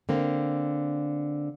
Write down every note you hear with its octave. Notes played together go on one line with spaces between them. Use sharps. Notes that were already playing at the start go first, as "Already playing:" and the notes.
D3 A#3 C4